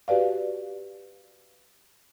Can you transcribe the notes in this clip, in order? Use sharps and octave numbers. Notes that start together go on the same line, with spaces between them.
F#4 G4 B4 D5 F5